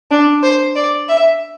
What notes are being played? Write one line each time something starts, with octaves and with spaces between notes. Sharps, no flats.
D4
C5
D5
E5